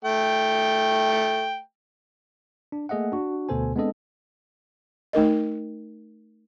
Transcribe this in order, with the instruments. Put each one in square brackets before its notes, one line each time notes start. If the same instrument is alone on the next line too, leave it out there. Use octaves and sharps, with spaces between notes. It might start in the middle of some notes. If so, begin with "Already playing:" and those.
[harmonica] A3 G5
[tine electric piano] D4
A3 A#3 G#4 D#5 E5 F#5
D4 F#4
D2 B2 B3 A4 C5 G#5
G#3 B3 C4 D4 A4 D#5
[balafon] A3 D#4 A#4 D#5